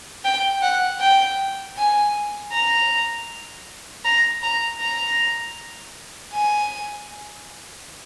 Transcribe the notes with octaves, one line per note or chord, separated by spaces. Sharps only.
G5
F#5
G5
G#5
A#5
A#5
A#5
A#5
G#5